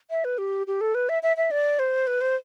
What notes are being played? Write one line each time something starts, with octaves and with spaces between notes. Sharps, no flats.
E5
B4
G4
G4
A4
B4
E5
E5
E5
D5
C5
B4
C5